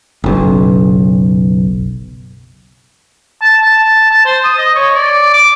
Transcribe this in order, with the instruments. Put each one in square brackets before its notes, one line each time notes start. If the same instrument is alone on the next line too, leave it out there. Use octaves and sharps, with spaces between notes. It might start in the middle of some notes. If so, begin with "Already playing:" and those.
[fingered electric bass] F#1 B1
[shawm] A5
A5
A5
C5
D#6
D#5
C#5
D5
D6